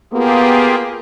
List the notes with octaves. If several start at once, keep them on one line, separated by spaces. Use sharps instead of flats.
A#3 B3 F4 G4 G#4